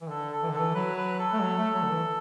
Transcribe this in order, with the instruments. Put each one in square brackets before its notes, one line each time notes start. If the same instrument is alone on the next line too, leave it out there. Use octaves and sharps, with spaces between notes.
[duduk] E3
[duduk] D3 [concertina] A4
[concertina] A4
[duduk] E3
[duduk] D3 [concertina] A4
[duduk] E3
[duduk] F#3 [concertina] B4
[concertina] B4
A4
[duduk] A3
F#3
A3
F#3
D3
E3